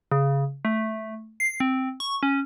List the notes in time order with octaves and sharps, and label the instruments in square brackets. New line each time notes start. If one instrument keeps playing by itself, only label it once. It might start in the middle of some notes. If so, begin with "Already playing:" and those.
[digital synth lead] C#3
A3
C7
C4
C#6
C#4